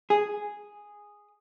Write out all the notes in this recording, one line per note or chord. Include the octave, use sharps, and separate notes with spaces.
G#4